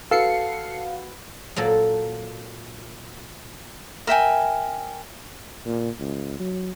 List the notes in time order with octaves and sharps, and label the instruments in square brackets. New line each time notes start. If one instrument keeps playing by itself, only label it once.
[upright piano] F#4 B4 [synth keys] A4 C7 C#7 [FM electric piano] F5
[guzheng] A#2 F#3 A#3 A4
[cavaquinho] A#4 E5 G5 G#5
[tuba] A#2
C#2
F#3